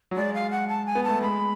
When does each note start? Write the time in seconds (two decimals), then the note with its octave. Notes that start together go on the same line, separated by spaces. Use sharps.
0.11 F#3
0.16 G#3 D5
0.34 F5
0.51 F#5
0.68 A5
0.86 G#5
0.95 B3
1.04 A3 A5
1.21 G#3 B5